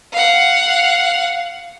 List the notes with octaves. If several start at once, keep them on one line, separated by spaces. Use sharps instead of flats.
F5 F#5